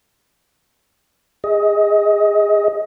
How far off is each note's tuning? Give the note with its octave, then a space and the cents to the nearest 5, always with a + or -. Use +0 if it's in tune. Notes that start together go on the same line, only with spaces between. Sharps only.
G#4 -20 D#5 +25